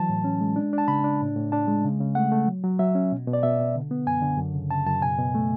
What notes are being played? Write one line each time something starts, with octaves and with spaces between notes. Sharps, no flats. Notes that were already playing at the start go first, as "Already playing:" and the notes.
Already playing: E3 F#3 A5
A2
C#4
G#3
D4
D4
A5
C#3 B5
D4
A2
A2
D4 A5
G#3
C#3
C#3
A3 F#5
A3
F#3
F#3
F#3 E5
C#4
B2
B2
D5
B2 E5
B2
D3
B3
F#2 G#5
D3
F#2
C#3
C#3 A5
F#2 A5
B2 G#5
B2
A3